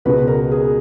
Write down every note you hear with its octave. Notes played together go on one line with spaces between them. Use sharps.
C#2 B2 G#3 B4
A#4
G#4